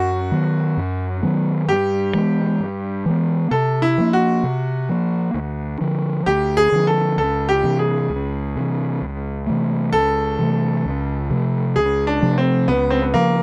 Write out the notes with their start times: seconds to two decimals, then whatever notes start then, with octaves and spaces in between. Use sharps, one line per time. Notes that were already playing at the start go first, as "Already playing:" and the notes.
Already playing: F#2 F#4
0.32 D#3 F#3 B3
0.77 F#2
1.22 D#3 F#3 B3
1.68 G2 G4
2.14 E3 G#3 B3
2.60 G2
3.06 E3 G#3 B3
3.51 C3 A4
3.82 E4
3.98 F3 A#3
4.13 F#4
4.43 C3
4.89 F3 A#3
5.34 D2
5.81 D3 F3
6.26 D2 G4
6.57 G#4
6.72 D3 F3
6.87 A4
7.18 C#2 A4
7.49 G4
7.63 C3 E3
7.79 G#4
8.10 C#2
8.56 C3 E3
9.02 C#2
9.47 C3 E3 A3
9.93 C#2 A4
10.39 C3 E3 A3
10.85 C#2
11.30 C3 F3 A3
11.76 C#2 G#4
12.07 D4
12.22 C3 F3 A3
12.38 C4
12.68 C#2 B3
12.90 C4
13.02 B3
13.13 C#3 F3 A#3